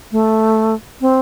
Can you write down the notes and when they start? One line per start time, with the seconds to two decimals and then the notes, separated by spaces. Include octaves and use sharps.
0.12 A3
1.01 C4